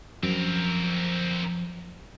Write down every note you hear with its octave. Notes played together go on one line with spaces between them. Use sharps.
F#2 F3 C4 A#4